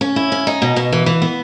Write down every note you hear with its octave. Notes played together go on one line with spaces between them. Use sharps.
C#4
E4
C#4
D#4
B2
B2
E3
E3
B3